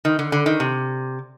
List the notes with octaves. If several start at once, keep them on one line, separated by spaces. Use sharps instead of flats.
D#3
D3
D3
D#3
C3